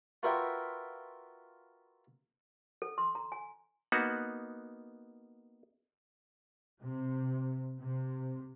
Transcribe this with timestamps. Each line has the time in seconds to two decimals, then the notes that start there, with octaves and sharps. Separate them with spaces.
0.23 F4 F#4 A#4 B4 E5 G5
2.82 A4
2.98 C6
3.15 A#5
3.32 G#5
3.92 A#3 B3 D#4 F#4
6.83 C3
7.79 C3